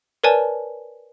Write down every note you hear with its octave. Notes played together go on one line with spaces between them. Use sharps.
A#4 B4 C#5 D5 G#5 A5